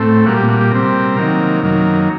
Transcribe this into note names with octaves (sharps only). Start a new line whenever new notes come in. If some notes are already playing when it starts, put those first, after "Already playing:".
Already playing: A2 A3 C4
A#2 G3 A#3 F#4
G4
F#4
G4
C3 G3 C4 A#4
C3 D#3 F#3 A#3
F#2 D#3 F#3 A#3